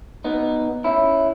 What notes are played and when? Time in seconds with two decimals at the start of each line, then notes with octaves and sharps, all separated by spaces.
0.24 B3 D#4
0.84 C#4 E4